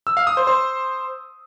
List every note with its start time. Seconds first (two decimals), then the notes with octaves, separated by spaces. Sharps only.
0.07 E6
0.17 F5
0.27 D#6
0.37 C5
0.47 C5